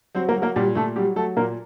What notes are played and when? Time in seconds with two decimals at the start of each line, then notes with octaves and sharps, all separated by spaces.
0.15 F#3 C4 C5
0.29 A#3 A#4
0.36 F#3
0.42 A#3 A#4
0.56 A#2 G3 G4
0.75 A#2 A3 A4
0.96 F#3 G3 G4
1.16 F#3 A3 A4
1.37 A#2 A#3 A#4